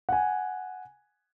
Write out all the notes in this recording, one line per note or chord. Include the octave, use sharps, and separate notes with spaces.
F#5 G#5